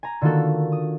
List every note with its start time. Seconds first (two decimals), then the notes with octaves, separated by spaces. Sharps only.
0.03 G#5 A#5
0.21 D3 D#3 A#3 F4 F#4 A4
0.72 D#6